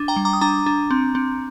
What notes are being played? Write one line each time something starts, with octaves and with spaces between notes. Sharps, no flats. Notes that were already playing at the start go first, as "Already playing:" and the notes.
Already playing: D4
G5 A#5
G3
A#5 D6
D#6
D4 A#5 D6
D4
C4
C4